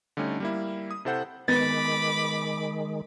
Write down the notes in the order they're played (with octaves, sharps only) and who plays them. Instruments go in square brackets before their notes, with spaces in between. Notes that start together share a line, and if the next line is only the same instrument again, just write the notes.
[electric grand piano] D3 G3 A3 C#4 D#4
G3 A#3 E4
D#6
C3 E4 A4 C5 F#5 G6
[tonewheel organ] D#3 G#3 [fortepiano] B3 [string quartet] B5 D6 [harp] A6